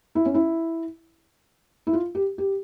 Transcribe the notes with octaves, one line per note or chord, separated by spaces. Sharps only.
E4
C#4
E4
E4
F4
G4
G4